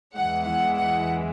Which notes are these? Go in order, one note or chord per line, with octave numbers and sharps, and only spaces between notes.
E2 E3 G#3 F#5
F#5
F#5